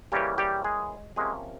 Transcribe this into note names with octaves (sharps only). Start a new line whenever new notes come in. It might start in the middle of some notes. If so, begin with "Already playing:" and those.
C#3 E3 G3 A#3 C#4 G4
G3 G4
G#3 G#4
C3 F3 G#3 A#3 C#4 G#4